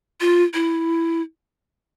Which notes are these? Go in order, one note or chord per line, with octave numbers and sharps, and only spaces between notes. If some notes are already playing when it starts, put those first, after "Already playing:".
F4
E4